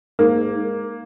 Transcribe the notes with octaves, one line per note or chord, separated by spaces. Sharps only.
G#2 A#3